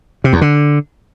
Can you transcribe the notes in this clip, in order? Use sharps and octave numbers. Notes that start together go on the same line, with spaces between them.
C3
E2
D3